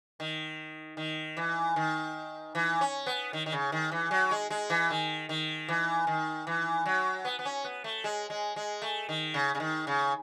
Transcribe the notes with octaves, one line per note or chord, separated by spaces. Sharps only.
D#3
D#3
E3
D#3
E3
C#4
B3
D#3
D#3
C#3
D#3
E3
F#3
G#3
G#3
E3
D#3
D#3
E3
D#3
E3
F#3
B3
B3
C#4
B3
A3
G#3
G#3
G#3
A3
D#3
C#3
C#3
D#3
C#3